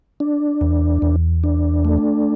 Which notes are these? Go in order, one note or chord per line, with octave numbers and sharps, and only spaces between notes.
D4
E2
E2
D4
A3